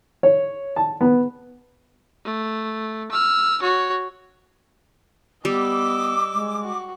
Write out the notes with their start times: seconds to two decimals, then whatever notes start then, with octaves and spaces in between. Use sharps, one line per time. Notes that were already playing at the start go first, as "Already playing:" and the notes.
0.23 C#5
0.76 A5
1.01 B3
2.25 A3
3.12 E6 F6
3.62 F#4 C#5
5.45 G3 B3 D#5 D6 E6
6.34 G#3
6.62 F#4